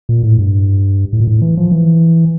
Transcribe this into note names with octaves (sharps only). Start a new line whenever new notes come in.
A#2
A2
G2
A2
A#2
A2
E3
F3
E3